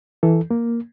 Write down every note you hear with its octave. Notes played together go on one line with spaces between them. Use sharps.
E3 A4
A#3